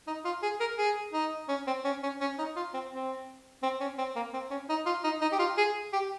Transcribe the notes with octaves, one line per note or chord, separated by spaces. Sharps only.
D#4
F4
G#4
A#4
G#4
D#4
C#4
C4
C#4
C#4
C#4
D#4
F4
C4
C4
C4
C#4
C4
A#3
C4
C#4
D#4
F4
D#4
D#4
G4
F4
G#4
G4